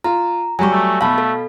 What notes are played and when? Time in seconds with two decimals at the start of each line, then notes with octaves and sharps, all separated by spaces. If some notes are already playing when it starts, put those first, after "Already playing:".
0.04 F4 A#5
0.59 F#3 G3 G#5 C#6
0.72 A3
1.01 B2 A3 F5 A5 B5
1.18 A4